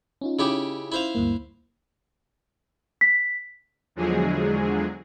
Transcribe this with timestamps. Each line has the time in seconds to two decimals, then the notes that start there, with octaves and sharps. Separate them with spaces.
0.21 C#4 D#4 F4
0.39 C#3 E4 G4
0.92 E4 C5 F5
1.15 D2 G2 A#3
3.01 B6
3.96 E2 D3 F3 F#3 G#3 G#4